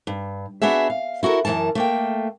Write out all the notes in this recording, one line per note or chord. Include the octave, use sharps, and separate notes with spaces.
G2
B3 D4 F#4 G#4 E5
F5
E4 F#4 A4 A#4
F#2 C#3 E3 A#4 A5
A3 A#3 G5